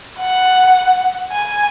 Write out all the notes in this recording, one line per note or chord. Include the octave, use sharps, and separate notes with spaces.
F#5
G#5